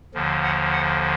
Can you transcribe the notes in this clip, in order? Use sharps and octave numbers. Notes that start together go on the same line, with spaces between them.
D#2 D3 F3
F#5
F#5